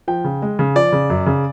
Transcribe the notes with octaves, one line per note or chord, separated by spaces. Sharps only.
F3 G5
C#3
G#3
C#3
F3 D5
C#3
F#2
C#3